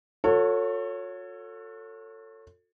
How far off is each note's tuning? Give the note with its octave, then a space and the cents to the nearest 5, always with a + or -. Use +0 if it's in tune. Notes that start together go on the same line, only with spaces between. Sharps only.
F#4 -40 A4 +25 C#5 +0